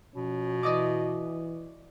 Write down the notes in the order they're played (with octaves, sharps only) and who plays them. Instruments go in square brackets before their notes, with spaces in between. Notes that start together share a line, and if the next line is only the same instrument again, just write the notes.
[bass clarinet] B2 [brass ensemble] F3 C#4
[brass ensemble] E3 [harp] D5 D#5 D6